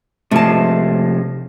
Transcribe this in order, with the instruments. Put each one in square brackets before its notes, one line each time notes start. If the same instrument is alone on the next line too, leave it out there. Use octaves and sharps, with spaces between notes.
[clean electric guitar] C3 F3 G#3 [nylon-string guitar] A3 A5